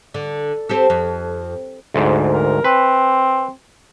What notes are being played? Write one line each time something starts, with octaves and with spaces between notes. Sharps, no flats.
D3
C4 G4 A4
F2
D2 G#2
A#4
C4 B4